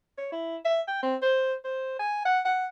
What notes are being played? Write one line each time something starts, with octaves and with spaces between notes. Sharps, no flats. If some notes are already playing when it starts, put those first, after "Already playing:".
C#5
E4
E5
G5
C4
C5
C5
G#5
F#5
F#5